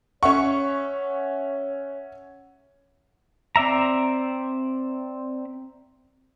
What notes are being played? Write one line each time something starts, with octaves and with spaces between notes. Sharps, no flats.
C#4 C#5 E5 F#5 C#6
C4 D5 E5 A#5